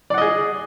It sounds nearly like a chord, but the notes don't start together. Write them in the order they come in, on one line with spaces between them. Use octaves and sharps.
D5 F#5 D#5 G#4